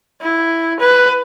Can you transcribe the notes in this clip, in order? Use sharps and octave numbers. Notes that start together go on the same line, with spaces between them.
E4
B4